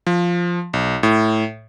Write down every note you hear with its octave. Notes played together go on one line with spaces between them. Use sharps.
F3
B1
A2